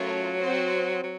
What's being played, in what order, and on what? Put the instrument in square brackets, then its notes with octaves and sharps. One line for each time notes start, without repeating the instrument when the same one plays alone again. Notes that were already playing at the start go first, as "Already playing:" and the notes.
Already playing: [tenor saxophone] F#3 [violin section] A3 C#4 F4 A#4 C#5
[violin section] C4 F#4 C5
[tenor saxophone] F#3